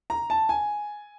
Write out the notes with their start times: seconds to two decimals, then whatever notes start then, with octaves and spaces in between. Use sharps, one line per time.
0.10 A#5
0.30 A5
0.49 G#5